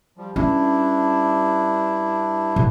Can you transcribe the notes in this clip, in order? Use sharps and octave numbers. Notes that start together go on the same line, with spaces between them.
F3 G3
G2 C#4 D4 E4
A2